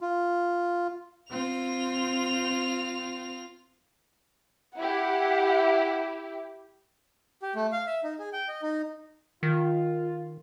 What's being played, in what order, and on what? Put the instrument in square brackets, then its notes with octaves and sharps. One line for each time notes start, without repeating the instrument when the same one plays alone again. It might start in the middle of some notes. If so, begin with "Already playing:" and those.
[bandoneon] F4
[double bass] C4 [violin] F4 F7
[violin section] E4 G4 [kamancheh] F#5
[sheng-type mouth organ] G4
A3
F5
E5
D#4
G#4
G5
D#5
D#4
[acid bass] D#3 [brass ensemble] F4